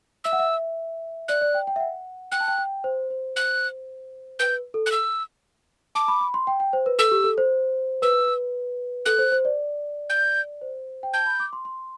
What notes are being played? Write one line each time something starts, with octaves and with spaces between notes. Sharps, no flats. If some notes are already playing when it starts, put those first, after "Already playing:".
E5 E6
F#5
E5
D5 F#6
D5
G5
G5
E5
F#5
G5 F#6
A5
G5
G5
C5
C5
C5 F#6
B4 G6
A4
F#6
E6
A5 D6
B5
B5
C6
G5
G5
C5
B4
A4 E6
G4
A4
C5
B4 E6
A4 F#6
C5
C5
D5
G6
C5
G5
A5 G6
B5
D6
C6
C6